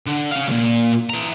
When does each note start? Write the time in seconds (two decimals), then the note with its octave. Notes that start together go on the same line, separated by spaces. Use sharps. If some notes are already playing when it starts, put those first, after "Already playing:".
0.07 D3
0.31 C#4 F5
0.48 C#2 A#2
1.10 E3 A#5